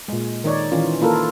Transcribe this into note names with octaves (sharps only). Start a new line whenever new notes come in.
A#2 G#3
D#3 D#4 C#5 D5
D#3 E3 C#4 F4
A#3 E4 F4 A4 A#4